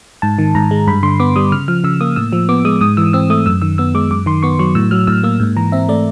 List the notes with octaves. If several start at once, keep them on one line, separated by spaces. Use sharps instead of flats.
G#2 A5
D#3
G#2 A#5
G#3
G2 B5
D3 C6
B3 D6
G3 D#6
C#3 F6
F3 F6
C#3 E6
A#3 D#6
A2 E6
F3
B3 D6
G#3 D#6
G#2 D#6
E3 E6
C4 E6
A3 D#6
F#2 E6
D#3 E6
B3 E6
G#3 D6
F#2 D6
D#3 C6
B3 C#6
F#3 C#6
A2 E6
F#3 F6
A2 E6
A#3 E6
G#2
E3 A#5
C4 E5
A3 D5